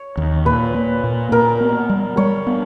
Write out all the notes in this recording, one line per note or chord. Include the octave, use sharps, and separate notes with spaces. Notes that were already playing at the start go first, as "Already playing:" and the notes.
Already playing: C#5
D#2
A#2 B4
A#3
A#2
A#2 A#4
B3
G3
G3 C#5
B3